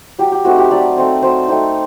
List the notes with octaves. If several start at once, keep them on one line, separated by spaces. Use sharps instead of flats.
F#3 G4
G4
A3 C4 D#4 F#4
G4
F#3 D5
A3 C4 D#4
F#3 C5
A3 C4 D#4